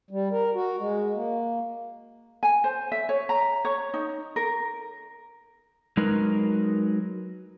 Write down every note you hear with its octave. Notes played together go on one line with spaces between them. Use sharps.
G3
A#4
F#4
G#3
A#3
G#5
C5
E5
C#5
A#5
C#5
D#4
A#4
F#3 G#3 D#4 F#4 A#4 B4